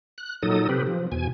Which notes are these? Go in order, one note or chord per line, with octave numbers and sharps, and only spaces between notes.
F#6
A#2 F#3 D#4 A4 D#6
C3 C4 G4 B4
F3
E2 B2 G#5